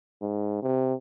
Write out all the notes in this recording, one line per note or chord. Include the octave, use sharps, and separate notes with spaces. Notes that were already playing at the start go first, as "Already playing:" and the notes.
G#2
C3